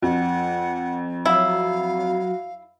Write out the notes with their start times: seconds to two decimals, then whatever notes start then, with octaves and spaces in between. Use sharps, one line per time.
0.02 F2 F#5
1.25 F#3 E4 F5